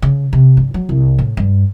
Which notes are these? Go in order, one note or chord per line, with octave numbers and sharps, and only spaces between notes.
C#3
C3
G2
F#3
C2
A2
G2